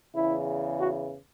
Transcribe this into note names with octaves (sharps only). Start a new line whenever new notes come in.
E2 C#3 E3 E4
F#4